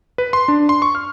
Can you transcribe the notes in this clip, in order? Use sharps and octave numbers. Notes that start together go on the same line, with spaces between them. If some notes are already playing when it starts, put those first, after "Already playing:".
B4
C6
D4
C6
C#6
F6